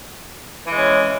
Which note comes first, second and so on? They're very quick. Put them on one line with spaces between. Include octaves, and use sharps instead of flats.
E3 G#3 C#4